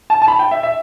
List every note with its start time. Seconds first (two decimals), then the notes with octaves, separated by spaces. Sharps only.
0.10 A5
0.22 A5
0.28 B5
0.39 G5
0.51 E5
0.63 E5